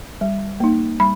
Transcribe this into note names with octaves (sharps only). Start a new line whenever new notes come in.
G3
A#3 D#4
G3 B5